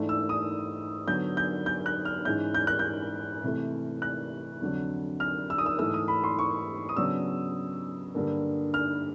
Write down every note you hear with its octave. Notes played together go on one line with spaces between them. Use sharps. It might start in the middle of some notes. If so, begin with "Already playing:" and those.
Already playing: G#2 E3 A3 D4
E6
D#6
D3 F#3 B3 G6
G6
G6
F#6
F6
G#2 E3 G#3 C#4 G6
G6
F#6
G6
C3 E3 A3
F#6
F2 D3 F#3
F6
E6
D#6
E6
G#2 E3 A3 E6
D#6
B5
C6
C#6
D#6
C#3 F#3 B3 D4 E6
G2 D3 G3 A#3
F6